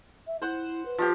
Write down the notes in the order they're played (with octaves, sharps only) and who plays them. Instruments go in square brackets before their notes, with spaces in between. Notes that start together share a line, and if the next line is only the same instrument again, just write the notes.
[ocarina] E5
[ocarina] E4 [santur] C5 F#5
[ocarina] B4
[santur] F3 F4 G4